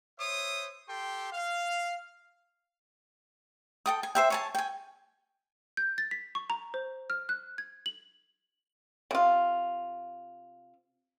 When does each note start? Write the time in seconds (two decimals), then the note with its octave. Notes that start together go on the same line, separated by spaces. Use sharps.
0.19 C5 C#5 E5 D#6
0.88 G4 A4 G5 C6
1.32 F5
3.86 A4 G5 D#6
4.03 G#5
4.15 C5 E5 G5
4.30 C#5 G#5 A5
4.55 G5 G#5
5.77 G6
5.98 A6
6.11 B6
6.35 C#6
6.50 A#5
6.74 C5
7.10 F6
7.29 F#6
7.58 G#6
7.86 F#7
9.11 C3 F4